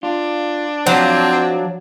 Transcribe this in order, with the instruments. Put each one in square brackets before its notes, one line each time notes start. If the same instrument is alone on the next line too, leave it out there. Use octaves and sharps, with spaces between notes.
[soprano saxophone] D4 [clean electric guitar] F4
[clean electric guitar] F3 F5 A#5 [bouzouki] F#3 [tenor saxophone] C4